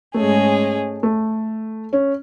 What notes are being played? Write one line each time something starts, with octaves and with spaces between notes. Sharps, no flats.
G#2 G#3 A3 C#4 G#4
A3
C#4